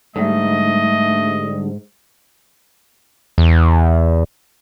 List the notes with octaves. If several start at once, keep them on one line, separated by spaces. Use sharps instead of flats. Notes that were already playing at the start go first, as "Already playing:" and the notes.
G#2 D3 G3 A3 D#5
E2